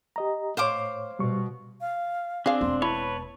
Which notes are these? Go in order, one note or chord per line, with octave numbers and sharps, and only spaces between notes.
G4 D#5 A#5
A2 C5 C#5 F5 D6
B2 G3 C#6
F5
C4 D4 G#4 F5
E1 B3 C6
E4 B4 C#5 A5